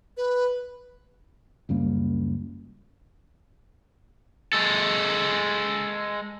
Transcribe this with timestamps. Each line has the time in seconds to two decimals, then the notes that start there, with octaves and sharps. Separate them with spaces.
0.17 B4
1.69 C#2 F#2 G3 A#3
4.53 G#3 A4